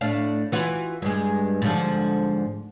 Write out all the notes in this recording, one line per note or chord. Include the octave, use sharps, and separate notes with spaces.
A2 D4 F5
E3 F4 F#4
G2 G#3
G#2 D3 F3